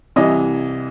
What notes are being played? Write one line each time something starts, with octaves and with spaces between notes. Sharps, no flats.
C2 C3 E3 D#5